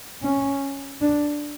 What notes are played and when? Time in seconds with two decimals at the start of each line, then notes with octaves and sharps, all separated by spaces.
0.23 C#4
1.01 D4